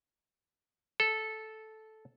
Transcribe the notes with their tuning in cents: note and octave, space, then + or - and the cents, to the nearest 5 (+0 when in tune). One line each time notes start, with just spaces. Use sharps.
A4 -10